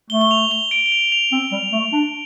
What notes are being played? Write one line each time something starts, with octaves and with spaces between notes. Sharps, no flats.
A3 G7
G7
F7
G7
D7
G7
F7
F7
C4
G3
A3
D4